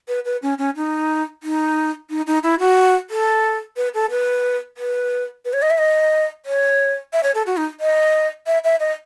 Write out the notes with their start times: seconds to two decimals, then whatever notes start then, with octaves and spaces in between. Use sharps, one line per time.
0.08 B4
0.25 B4
0.42 C#4
0.58 C#4
0.76 D#4
1.43 D#4
2.10 D#4
2.27 D#4
2.43 E4
2.60 F#4
3.10 A4
3.77 B4
3.94 A4
4.10 B4
4.77 B4
5.45 B4
5.53 C#5
5.62 D#5
5.70 E5
5.78 D#5
6.46 C#5
7.13 E5
7.23 C#5
7.35 A4
7.46 F#4
7.57 D#4
7.80 D#5
8.47 E5
8.64 E5
8.80 D#5